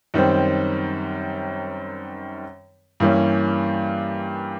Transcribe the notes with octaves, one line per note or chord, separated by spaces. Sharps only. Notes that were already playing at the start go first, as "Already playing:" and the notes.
F#2 D#3 G3 C4
G2 E3 G3 A#3 C#4